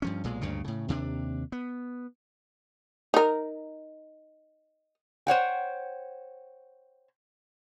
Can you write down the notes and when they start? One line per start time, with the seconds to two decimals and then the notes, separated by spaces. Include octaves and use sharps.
0.02 G2 F3 C#4
0.24 B1 A#2 G#3
0.41 D2 G2 A#2 C#3
0.64 A2 C#3
0.88 D#2 C3 C#4 D4
1.52 B3
3.14 D#4 A#4
5.27 C5 C#5 F#5 G5